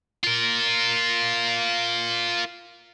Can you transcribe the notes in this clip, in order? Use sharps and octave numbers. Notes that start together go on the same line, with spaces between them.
F4 A#4